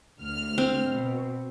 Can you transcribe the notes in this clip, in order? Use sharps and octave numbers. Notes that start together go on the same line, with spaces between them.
D2 F6
C4
B2